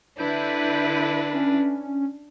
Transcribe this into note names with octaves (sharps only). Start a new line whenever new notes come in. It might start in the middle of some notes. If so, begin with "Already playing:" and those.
D3 D4 E4 B4 G6
C#4